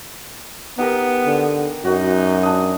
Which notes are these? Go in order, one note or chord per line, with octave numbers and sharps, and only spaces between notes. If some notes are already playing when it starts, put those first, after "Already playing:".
B3 D#4 G4 A#4
D3
F#2 D#4 F#4
D4 D#5